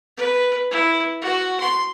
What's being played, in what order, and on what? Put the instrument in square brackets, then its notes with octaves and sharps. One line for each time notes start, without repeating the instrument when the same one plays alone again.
[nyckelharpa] B4
E4
F#4
C6